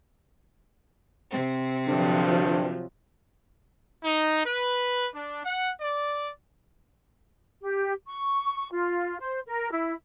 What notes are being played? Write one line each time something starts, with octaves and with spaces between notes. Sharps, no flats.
C3 C4
C2 G2 D3 F3 F#3
D#4
B4
D4
F#5
D5
G4
C#6
F4
C5
A#4
E4